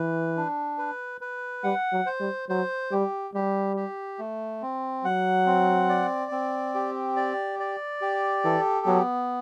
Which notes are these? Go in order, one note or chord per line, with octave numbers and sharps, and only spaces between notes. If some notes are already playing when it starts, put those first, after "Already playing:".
Already playing: E3 B4
D4
B4
B4
G3 F#5
F#3
C5
G3
F#3 C5
G3 G4
G3 G4
G4
A3
C4
F#3 F#5
C4
D5
C4
G4
D5
D5
G4
E3 A4
F#3 B3